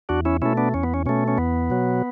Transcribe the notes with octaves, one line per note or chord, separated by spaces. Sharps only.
E2 D4 F#4
C#4 E4
B2 A3 C#4 E4
B3 D4
E2 C#4
B3
C#4
B2 A3 C#4
C#4
E2 B3
B2 F#3